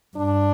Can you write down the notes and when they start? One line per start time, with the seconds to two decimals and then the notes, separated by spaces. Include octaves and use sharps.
0.17 G2 D4